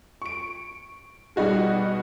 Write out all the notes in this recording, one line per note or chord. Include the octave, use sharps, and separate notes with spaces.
C#6 D7
B2 G3 D#4 F#4 G#4